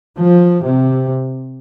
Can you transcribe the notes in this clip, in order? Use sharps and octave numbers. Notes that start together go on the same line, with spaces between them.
F3
C3